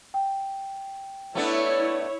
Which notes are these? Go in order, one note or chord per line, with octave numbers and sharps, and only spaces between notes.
G5
A3 B3 D4 E4 C#5